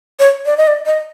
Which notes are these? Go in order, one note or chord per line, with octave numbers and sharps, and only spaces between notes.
C#5
D5
D#5
D5
D#5